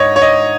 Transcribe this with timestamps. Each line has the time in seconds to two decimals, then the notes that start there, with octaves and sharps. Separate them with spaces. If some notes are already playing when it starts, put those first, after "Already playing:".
Already playing: G#2 C#5 D#5
0.16 C#5
0.22 D#5